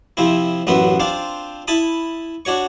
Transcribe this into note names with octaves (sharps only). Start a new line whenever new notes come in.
C3 F3 C4 E4
A1 F#2 B3 F#4 E5 C6
C4 D4 F4 C5
E4 A5 B5 D#6
D4 F#4 C#5 C#6